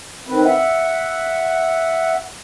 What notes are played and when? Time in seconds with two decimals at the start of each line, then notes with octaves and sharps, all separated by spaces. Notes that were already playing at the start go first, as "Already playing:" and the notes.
0.27 D#3 C4 B4
0.45 E5 F#5